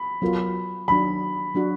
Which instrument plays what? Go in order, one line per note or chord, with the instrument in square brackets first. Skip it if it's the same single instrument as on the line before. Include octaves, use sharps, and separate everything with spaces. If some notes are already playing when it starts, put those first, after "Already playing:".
Already playing: [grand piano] B5
[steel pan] F#3 B3 F4 A#4
[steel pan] D#3 F#3 D4 [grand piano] B5
[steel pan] F#3 D4 F#4